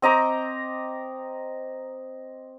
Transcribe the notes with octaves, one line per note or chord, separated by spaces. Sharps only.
C4 D#5 A#5 D6